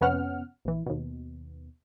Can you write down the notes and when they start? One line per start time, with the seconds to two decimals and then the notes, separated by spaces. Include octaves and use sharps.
0.01 F2 C3 B3 C#4 F#5 F6
0.65 A#1 E3
0.86 D#2 B2